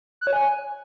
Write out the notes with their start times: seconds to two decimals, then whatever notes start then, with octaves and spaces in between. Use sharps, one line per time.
0.21 F#6
0.27 C#5
0.33 G#5